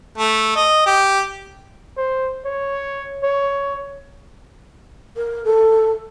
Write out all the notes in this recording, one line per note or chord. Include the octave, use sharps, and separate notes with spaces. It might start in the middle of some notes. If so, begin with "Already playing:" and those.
A3
D#5
G4
C5
C#5
C#5
A#4
A4